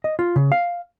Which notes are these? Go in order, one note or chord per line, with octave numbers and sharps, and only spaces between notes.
D#5
F4
C#3
F5